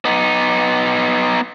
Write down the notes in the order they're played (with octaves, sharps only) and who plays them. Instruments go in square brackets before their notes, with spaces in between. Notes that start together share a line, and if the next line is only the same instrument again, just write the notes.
[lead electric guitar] B3 D#4